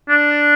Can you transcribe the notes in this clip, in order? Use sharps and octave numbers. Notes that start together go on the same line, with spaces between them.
D4